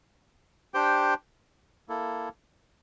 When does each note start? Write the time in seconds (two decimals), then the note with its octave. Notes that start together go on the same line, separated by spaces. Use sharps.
0.74 D4 G4 C5 G5
1.89 A#3 E4 A4